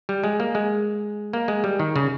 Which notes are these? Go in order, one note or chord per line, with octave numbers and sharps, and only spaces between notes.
G3
G#3
A#3
G#3
A#3
G#3
G3
D#3
C#3